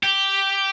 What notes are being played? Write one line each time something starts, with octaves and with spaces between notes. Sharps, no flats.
G4